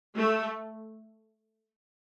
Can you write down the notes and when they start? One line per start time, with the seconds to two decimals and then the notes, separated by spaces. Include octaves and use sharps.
0.16 A3